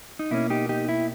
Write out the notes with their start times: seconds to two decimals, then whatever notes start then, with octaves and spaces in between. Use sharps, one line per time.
0.19 D#4
0.31 B2 A#3 C#4 E4
0.50 D#4 G4
0.69 D#4 G4
0.89 E4